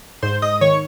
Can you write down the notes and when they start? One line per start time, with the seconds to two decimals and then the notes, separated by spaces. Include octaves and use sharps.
0.22 G#2 C5 C6
0.42 G#2 D#5 D#6
0.61 D#3 C#5 C#6